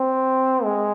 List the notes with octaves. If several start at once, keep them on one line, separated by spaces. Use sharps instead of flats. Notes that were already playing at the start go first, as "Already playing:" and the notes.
Already playing: C4
G#3